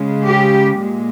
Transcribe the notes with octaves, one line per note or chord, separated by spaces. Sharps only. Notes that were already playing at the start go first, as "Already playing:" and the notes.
Already playing: C#3 G#3
G4
A#2 G#3